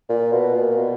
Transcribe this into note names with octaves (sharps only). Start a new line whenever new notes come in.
A#2
B2
A#2
B2